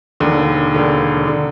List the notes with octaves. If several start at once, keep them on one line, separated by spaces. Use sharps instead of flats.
E1 D#2 D3
E1 D#2 D3
D3